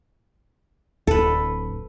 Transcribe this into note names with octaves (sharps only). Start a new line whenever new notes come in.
D1 A4 B4